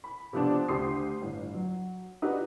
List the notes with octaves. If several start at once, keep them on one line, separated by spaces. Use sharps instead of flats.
B5
C3 F3 B3 C4 D4
D2 G4 C6 D#6 C7
G1 A2
F#3
D#4 F#4 G4 B4 D5 D#5